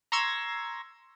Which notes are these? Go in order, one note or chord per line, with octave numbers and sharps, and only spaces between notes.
A#5 C6 C#6 E6 G#6 A#6